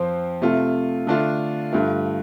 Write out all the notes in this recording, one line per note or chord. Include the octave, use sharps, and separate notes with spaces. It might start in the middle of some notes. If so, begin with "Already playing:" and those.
Already playing: F2 F3 C4
C3 A3 F4
D3 A3 D4 F4
G2 D3 A3 F4